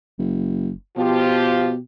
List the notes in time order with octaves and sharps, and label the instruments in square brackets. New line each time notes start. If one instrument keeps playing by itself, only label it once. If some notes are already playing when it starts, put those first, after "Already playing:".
[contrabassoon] F#1
[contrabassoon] B2 [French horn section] F3 F4 G4